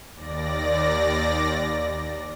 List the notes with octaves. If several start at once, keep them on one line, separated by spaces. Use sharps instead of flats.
D#2 D5 A#6